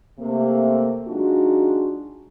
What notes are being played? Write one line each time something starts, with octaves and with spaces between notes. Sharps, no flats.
C3 A3 A#3
F#3 G#3 D4 D#4 F4 F#4